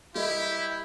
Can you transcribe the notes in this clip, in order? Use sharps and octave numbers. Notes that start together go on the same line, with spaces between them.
G3 E4 G4 A#4 D#5